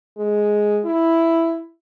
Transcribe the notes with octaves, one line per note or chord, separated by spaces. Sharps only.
G#3
E4